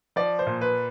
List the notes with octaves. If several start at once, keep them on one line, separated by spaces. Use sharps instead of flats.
F3 D5
C5
A#2
B4